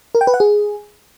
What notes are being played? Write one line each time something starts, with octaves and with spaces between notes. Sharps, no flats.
A#4
G5
B4
F#5
G#4